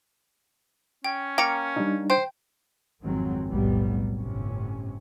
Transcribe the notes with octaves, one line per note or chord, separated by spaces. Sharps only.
C#4 G5
A#3 G5 A#5 C#7
G3 D4 D#4
C5 G5
G#1 F2 D#3 F#3 G#3 C4
F1 B1 A2 F#3 G3 B3
G1 A2 C3 C#4